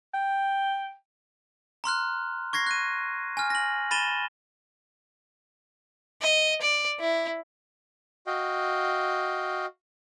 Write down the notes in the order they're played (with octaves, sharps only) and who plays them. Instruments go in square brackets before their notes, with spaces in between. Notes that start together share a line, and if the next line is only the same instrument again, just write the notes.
[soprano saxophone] G5
[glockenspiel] A#5 C6 F6 F#6
C#6 G#6 A#6 C7
F#6 D#7
G#5 F6
A#6 F#7
B5 A6 D#7 E7 G7
[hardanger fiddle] D#5
D5
E4
[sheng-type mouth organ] F#4 D#5 F5 G5